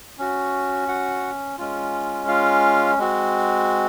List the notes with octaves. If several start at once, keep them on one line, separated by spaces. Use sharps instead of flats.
C#4 F#4
F#4 F#5
G#3 C#4 F4
F4 F5
G#3 C4 F#4